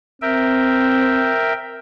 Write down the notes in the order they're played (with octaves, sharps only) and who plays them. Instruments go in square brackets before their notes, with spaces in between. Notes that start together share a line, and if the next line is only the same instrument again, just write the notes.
[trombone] C4 [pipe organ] A#4 E5 G5